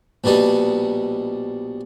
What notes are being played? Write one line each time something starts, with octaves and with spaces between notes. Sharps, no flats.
A#1 B2 G3 D4 D#4